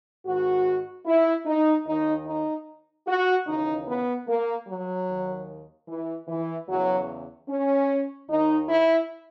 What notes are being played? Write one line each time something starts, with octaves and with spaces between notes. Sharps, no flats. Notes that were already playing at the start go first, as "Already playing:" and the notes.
G#2 D#3 F#4
E4
D#4
D#2 D#3 D#4
D#4
F#4
D#2 C#3 E3 D#4
B3
A#3
F#3
D#2 D#3
E3
E3
E2 C#3 E3 F#3
C#4
D#2 D#3 D#4
E4